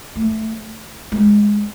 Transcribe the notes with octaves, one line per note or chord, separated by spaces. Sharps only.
A3
G#3